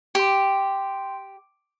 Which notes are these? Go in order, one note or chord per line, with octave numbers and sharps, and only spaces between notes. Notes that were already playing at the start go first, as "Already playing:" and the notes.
G4 G5 C6